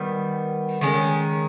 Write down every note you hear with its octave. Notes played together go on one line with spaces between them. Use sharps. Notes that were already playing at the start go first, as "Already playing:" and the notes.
Already playing: D#3 G3 B3
D#3 G#3 C#4